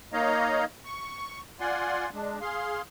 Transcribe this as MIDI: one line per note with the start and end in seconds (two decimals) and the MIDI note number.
0.13 0.65 58
0.13 0.65 63
0.13 0.65 73
0.13 0.65 75
0.13 0.65 77
0.13 0.65 82
0.85 1.41 85
1.60 2.10 65
1.60 2.10 74
1.60 2.10 78
1.60 2.10 80
1.60 2.10 84
2.14 2.39 56
2.14 2.39 62
2.41 2.82 68
2.41 2.82 77
2.41 2.82 84